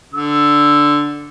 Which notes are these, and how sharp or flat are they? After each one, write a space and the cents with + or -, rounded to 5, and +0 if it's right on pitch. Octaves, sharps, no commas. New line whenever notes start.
D3 +0 E6 +0